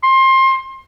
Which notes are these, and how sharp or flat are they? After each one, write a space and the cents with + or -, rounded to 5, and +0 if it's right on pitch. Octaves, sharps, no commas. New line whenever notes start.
C6 +25